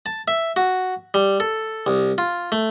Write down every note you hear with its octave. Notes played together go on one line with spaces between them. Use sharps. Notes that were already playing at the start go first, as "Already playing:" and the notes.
A5
E5
F#4
G3
A4
C2
F4
A3